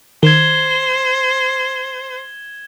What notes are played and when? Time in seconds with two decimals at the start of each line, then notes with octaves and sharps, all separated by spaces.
0.23 D#3 C5 G#6 E7 G7